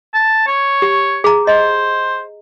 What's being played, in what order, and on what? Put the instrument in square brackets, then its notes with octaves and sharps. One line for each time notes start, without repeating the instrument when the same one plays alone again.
[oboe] A5
C#5
[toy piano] G4
G#4 A#5
[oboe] C5 [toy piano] D#5